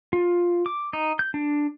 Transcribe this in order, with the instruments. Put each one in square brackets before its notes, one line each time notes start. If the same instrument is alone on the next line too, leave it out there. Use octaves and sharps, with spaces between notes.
[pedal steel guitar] F4
D6
D#4
G6
D4